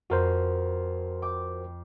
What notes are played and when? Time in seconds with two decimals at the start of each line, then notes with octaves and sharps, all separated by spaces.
0.10 F2 F#4 A#4 C5
1.22 G5 D6